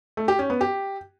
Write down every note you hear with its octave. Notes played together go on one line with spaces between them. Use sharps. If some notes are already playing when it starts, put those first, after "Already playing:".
A3
G4
C#4
B3
G4